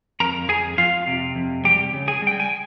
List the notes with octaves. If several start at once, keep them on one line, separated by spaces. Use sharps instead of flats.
F2 A#4 A#5
F2 G#4 G#5
F2 F4 F5
C3
F2
G3 G4 G5
C#3
G#4 G#5
G3 G5
G#5